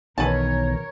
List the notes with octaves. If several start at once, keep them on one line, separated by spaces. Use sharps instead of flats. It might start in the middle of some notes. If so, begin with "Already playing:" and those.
B1 E2 D#3 E3 A#4 B4 C#5 A5